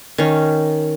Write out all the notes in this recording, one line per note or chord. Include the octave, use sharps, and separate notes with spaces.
D#3 C#4